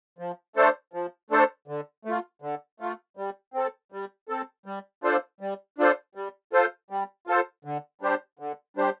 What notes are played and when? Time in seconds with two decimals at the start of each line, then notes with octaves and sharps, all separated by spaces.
0.19 F3
0.56 A3 D4 A4 C5
0.93 F3
1.30 A3 D4 A4 C5
1.68 D3
2.05 A3 F4
2.42 D3
2.80 A3 F4
3.17 G3
3.54 C4 A4
3.92 G3
4.29 C4 A4
4.66 G3
5.03 D4 F4 A4 C5
5.41 G3
5.78 D4 F4 A4 C5
6.15 G3
6.53 F4 A4 C5
6.90 G3
7.27 F4 A4 C5
7.65 D3
8.01 G3 D4 G4 C5
8.39 D3
8.77 G3 D4 G4 C5